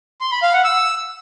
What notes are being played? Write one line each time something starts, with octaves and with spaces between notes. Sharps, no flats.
C6
B5
F5
F#5
E6